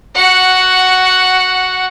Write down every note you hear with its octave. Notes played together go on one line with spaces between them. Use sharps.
F#4 F#5